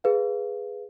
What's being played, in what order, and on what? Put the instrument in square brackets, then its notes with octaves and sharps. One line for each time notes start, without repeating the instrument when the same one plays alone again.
[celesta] G#4 B4 F5